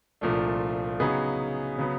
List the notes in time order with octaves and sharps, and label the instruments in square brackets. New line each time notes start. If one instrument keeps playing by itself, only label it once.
[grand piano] C2 A#2 F3 A3 D4
C#3 F#3 B3 D#4 G#4
C#3 F#3 B3